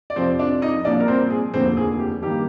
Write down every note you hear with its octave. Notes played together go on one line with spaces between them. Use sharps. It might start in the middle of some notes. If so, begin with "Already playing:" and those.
D5
F2 C3 F3 C4 C5
D4 D5
D#4 D#5
C2 A#2 F3 A#3 D4 D5
A#4
C4 C5
G#4
F1 D#2 D3 F3 A#3 C4 C5
G#4
G4
G2 D#3 G3 A#3 G4